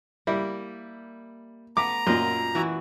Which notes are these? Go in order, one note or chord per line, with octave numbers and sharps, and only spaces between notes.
G3 A#3 E4
A3 B3 A#5 D6
F#2 A#2 F4 D#5
E3 E4 F#4